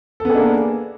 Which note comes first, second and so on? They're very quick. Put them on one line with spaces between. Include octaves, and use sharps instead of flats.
A4 B3 G#4 D4 A#3